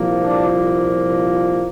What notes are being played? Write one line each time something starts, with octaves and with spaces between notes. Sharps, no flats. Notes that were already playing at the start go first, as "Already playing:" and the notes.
Already playing: C2 A#2 F3 A#3
D4